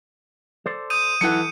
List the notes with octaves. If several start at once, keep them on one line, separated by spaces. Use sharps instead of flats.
A4 C5 D5
D#6 G6 D#7
E3 F#3 A4 F#5 C#7